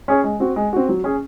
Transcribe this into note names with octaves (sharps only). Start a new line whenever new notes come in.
C#4 G#4 C#5
G#3
C4 F#4
G#3
C4 F#4
F#3
C#4 G#4